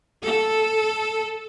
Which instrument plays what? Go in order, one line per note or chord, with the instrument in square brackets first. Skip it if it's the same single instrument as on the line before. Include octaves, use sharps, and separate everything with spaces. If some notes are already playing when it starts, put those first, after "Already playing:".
[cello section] A4